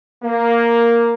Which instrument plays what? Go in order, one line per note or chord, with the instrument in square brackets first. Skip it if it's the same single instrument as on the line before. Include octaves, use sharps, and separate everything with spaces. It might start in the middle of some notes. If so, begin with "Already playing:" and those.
[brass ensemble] A#3